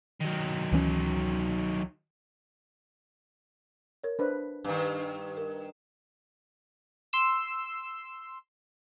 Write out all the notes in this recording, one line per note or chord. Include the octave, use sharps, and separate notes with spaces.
D#3 F#3
C#2 E3 C#4
A#4 C#5
D4 B4 C5
G2 D#3
A#4
C6 E6